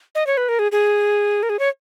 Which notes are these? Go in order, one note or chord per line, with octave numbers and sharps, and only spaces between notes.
D#5
C#5
B4
A#4
G#4
G#4
A#4
G#4
C#5